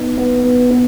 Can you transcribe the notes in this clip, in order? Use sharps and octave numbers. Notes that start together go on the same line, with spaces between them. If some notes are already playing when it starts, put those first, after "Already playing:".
Already playing: B3 D#4
B3
B3
B3